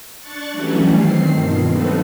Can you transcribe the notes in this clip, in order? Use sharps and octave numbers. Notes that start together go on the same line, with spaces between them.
D4 C#6 F#6 A6 C#7
E3 F#3 G3 A3 C#4
D#3 C4 C7
G2 B2 D#3 F3
F#3 A#3 C4 D#4 A4 B4